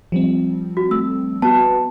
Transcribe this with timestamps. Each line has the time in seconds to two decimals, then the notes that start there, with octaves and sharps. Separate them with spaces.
0.12 F3 G3 C4
0.77 F#4
0.91 A3 E6
1.42 B3 F#4 A5